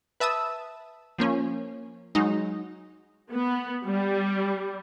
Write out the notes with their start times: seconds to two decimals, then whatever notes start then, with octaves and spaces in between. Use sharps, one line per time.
0.20 B4 E5 A5 D#6 E6
1.18 F3 A#3 C#4
2.15 F#3 G#3 D#4
3.32 B3
3.85 G3